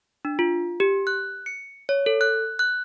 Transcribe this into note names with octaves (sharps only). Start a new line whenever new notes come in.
D4
F4
G4
F#6
C#7
C#5
A4
F#6
F#6